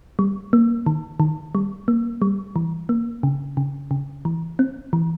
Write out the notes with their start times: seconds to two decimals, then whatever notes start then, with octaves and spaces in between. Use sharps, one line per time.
0.19 G3
0.53 A#3
0.86 D#3
1.20 D#3
1.55 G3
1.88 A#3
2.22 G3
2.56 E3
2.89 A#3
3.23 C#3
3.57 C#3
3.91 C#3
4.25 E3
4.59 C4
4.93 E3